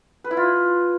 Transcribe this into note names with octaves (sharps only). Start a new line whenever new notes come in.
B4
E4
F4